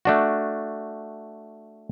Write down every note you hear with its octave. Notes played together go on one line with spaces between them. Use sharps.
A3 D4 F#4